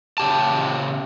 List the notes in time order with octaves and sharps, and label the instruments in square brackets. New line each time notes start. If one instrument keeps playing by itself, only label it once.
[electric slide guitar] C#3 G4 A5